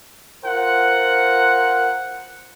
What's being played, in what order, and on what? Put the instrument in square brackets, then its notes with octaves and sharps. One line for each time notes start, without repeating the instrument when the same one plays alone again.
[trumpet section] F4 A#4 C5 F#5